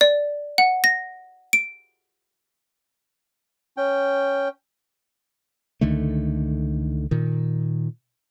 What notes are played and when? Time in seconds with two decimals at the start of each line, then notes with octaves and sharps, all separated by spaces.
0.01 D5
0.58 F#5
0.84 A#6
1.53 D7
3.77 C#4 G5
5.81 C#2 D3 D#3 A3
7.11 A#2 D#3